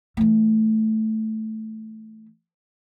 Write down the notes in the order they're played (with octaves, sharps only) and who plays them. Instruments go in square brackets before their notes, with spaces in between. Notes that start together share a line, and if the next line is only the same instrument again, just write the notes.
[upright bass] E3 A3